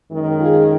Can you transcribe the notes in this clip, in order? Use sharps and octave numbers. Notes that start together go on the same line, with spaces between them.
F#2 D#3 G#3
F4 G#4